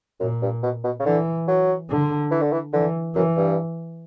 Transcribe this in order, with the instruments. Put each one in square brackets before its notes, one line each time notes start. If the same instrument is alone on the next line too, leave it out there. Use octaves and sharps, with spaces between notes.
[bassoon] F#2 [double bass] A#2
[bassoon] G2
B2
B2
C#3
[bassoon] D3 [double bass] E3
[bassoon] F#3
[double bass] D3
[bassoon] E3
D3
E3
[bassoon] D3 [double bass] E3
[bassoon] F#2 [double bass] E3
[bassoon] G2